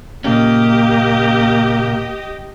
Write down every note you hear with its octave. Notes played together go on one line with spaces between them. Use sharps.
A#2 C#3 A#3 C#4 G4 D#5